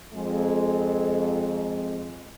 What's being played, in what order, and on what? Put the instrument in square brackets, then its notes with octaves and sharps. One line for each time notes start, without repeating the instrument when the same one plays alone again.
[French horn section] F2 G#3